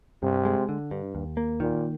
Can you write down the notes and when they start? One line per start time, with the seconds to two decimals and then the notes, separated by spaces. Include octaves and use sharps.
0.23 G2 C3
0.45 G#3
0.69 D3
0.91 G2
1.15 D#2
1.37 A#3
1.60 A#2 D#3